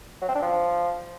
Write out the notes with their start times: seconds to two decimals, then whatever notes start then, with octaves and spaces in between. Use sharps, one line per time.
0.22 F#3
0.29 C4
0.35 D4
0.42 F3